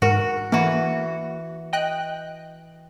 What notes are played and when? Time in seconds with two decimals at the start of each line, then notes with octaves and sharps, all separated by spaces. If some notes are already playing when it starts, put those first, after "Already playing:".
0.02 G#2 F#4 A#4
0.52 E3 A#3 F#4
1.73 D#5 G5 F#6